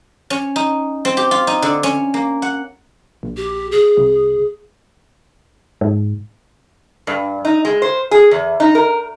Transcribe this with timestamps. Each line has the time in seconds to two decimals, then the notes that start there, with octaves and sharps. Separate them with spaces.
0.30 C#4
0.56 D#4
1.05 C4
1.17 G4
1.31 F4
1.47 D#4
1.62 D3
1.83 C#4
2.14 A#3
2.42 F#5
3.23 A#1
3.37 G4
3.72 G#4
3.97 C2
5.81 G#2
7.07 G2
7.45 D#4
7.65 G#3
7.82 C5
8.11 G#4
8.31 E2
8.60 D#4
8.75 A#4